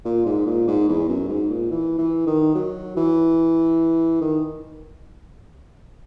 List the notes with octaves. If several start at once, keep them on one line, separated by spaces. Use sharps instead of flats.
A#2
G#2
A#2
G#2
E2
F#2
G#2
A#2
E3
E3
D#3
F#3
E3
D#3